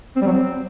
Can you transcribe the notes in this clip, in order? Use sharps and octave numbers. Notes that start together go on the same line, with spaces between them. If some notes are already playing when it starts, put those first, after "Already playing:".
C4
G3
F#3
C4